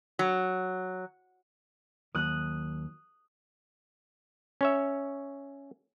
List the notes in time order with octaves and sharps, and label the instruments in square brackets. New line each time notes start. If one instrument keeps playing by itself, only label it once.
[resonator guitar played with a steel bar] F#3
[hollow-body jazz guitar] D#2 F#3 [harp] D#6 F#6
[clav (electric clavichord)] C#4 C#5 E5